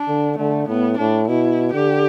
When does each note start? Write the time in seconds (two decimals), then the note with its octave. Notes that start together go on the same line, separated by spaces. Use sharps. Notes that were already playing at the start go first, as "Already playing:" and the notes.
Already playing: D4
0.08 D3
0.38 D3 A3
0.68 A2 B3
0.98 A2 D4
1.28 B2 E4
1.74 D3 G4